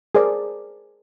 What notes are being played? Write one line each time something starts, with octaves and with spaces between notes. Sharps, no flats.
G#4 A#4 C5 D5